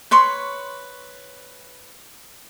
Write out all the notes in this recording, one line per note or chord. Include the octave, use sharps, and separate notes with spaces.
B4 C#5 C6 C#6